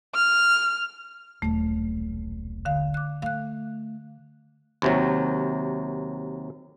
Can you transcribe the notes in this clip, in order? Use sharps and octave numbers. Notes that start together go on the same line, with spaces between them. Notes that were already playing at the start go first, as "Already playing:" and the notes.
F6
D#1 B1 A3
D3 F5
D6 F#6
A3 F5 F#6
D#2 C3 F#3